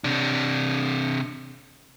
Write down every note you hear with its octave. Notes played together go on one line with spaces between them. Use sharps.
C3 D4